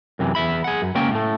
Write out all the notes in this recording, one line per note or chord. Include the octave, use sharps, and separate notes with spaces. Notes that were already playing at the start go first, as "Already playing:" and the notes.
F#2 C3 E3
E2 E5 B5
G#4 F#5
F#2
C#2 A#3 C#4 G5
A2 A3